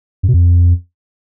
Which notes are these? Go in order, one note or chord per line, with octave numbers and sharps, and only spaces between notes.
F#2
B2
F2